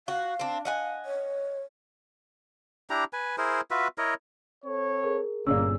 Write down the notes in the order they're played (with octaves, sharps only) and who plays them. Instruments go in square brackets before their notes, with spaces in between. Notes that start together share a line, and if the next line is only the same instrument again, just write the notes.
[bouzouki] F#4 [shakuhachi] F5
[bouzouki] C4 D4
[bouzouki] D#5 F#5 G#5 [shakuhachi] F5
[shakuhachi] C#5
[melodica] D4 E4 G4 A#5
B4 G#5
E4 G#4 A#4 C5
F4 F#4 B4 E5
E4 A#4 C#5 D#5
[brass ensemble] C4 A4 C#5
[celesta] G#4 A#4
[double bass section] G1 A#2 [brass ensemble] A#3 [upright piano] C#4 G#4 D5 [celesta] E6